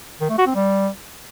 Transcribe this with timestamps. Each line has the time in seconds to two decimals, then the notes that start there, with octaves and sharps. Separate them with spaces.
0.21 D#3
0.30 A3
0.38 F#4
0.47 C4
0.55 G3